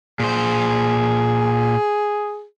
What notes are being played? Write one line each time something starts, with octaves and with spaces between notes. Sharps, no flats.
A#2 G#4 C5